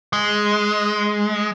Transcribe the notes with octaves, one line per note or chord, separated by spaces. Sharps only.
G#3